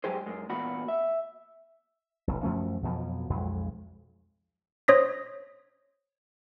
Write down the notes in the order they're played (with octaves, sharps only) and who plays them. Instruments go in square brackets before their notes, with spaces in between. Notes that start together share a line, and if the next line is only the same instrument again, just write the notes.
[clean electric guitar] G#2 F#3 G#3 G4 G#4 C5
F#2 G#3
E2 A#2 F#4 B5
E5
[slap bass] F1 B1
F#2 F3 A3 C#4
F2 B2 F3 F#3
B1 F2 G#3
[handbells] C5 C#5 D#6 A#6 B6